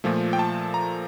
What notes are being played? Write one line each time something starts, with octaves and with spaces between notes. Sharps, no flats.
A#2 F3 A3
G5
A5
A#5